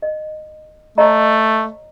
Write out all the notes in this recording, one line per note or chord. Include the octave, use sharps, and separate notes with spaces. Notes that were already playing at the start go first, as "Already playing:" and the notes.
D#5
A3 C#5 D#5 A#5